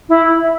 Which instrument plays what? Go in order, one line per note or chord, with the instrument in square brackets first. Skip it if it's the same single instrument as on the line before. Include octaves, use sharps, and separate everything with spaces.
[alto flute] E4